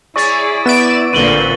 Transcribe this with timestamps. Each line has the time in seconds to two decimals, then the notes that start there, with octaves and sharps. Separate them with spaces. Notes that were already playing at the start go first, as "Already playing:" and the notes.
0.16 E4 G#4 C#5 D5 C#6 A6
0.66 B3 D5 E5 D7 E7
1.13 A1 A#2 D3 C4 B4 D#7 F#7 G7